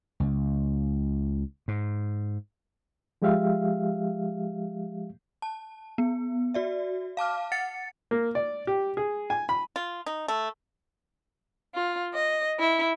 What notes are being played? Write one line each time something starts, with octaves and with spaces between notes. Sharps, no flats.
C#2
G#2
F3 G#3 G4 E5 F5
A5
B3
F#4 D5 E5
F5 A5 D6 F6
F#5 A6 C#7
A#3
D5
G4
G#4
G#5
B5
F4
D#4
A3
F4
D#5
E4